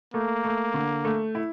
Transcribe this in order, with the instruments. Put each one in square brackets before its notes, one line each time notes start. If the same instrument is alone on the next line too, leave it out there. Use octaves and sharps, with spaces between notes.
[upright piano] A3 [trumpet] A#3
[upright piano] A3
D3
A3
E4